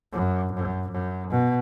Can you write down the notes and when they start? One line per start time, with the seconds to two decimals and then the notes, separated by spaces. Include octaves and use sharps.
0.13 F#2
0.52 F#2
0.89 F#2
1.30 B2